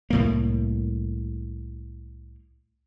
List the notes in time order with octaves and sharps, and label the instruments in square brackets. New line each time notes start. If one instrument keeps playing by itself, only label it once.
[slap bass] C2 A2 A#3